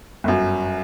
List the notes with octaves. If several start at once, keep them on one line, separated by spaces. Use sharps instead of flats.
G1 F#2